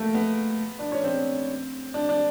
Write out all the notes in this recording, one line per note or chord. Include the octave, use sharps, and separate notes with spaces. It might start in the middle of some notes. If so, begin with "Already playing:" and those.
Already playing: A3 A#3
B3
D4
C#4
C4
D4
D4